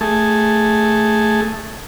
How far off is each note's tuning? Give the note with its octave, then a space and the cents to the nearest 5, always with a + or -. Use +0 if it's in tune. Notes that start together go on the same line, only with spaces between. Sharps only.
A3 +5 G#4 +0